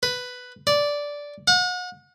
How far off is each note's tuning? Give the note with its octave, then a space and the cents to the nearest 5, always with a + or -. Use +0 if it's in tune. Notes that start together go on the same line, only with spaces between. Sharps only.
B4 +5
D5 -10
F#5 -35